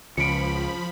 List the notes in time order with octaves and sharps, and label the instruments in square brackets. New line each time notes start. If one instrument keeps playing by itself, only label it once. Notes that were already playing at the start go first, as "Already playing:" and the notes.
[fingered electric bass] C#2 [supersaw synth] F3 B5 [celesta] C#7 D7